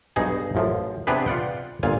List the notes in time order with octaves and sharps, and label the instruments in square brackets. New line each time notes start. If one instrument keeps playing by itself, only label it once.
[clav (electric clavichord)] B1 G2 D#4 G#4 G#5
A1 F#2 F3
C3 B3 D4 G4 G#4 B4
F4 D5 F#5 G5
G1 A#2 F4 F5 G#5